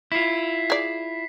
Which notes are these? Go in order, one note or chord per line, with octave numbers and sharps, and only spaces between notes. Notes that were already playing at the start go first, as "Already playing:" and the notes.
E4 F4 B6 C7
G#4 D5